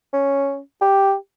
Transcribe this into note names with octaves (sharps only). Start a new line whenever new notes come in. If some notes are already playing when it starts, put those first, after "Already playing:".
C#4
G4